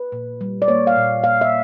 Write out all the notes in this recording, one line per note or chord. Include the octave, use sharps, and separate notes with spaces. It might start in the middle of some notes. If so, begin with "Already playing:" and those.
Already playing: B4
A#2
G3
D5
A#3 C#5
F5
A#2
A#2 F5
E5